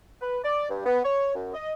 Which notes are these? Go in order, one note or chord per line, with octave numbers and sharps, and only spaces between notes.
B4
D5
G2
B3
C#5
F#2
D#5